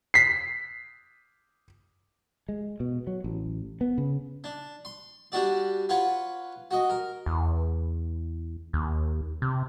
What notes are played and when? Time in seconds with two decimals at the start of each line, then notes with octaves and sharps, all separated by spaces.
0.14 B6 C7
2.49 G#3
2.80 B2
3.07 F#3
3.24 A1
3.81 B3
3.98 C#3
4.44 D4
4.85 C6
5.32 G3 D4 F#4 D5
5.89 F4 B4 C#5 F#5
6.71 F#4 D#5
6.90 A#4
7.26 E2
8.73 D#2
9.42 C3